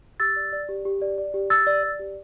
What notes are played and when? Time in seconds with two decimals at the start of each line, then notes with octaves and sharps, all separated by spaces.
0.20 G4 E6 A6
0.36 D5
0.53 D5
0.69 G4
0.85 G4
1.02 D5
1.18 D5
1.34 G4
1.50 G4 E6 A6
1.67 D5
1.83 D5
1.99 G4